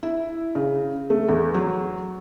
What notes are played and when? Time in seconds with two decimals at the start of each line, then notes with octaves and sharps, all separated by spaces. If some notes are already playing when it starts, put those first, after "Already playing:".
0.03 E4
0.55 C#3
1.10 A3
1.29 E2
1.54 F#3